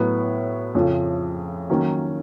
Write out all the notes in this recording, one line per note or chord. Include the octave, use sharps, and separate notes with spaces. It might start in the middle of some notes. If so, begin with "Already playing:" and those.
Already playing: A2 F#3 B3
F2 C#3 F3
D#3 F#3 A#3 C#4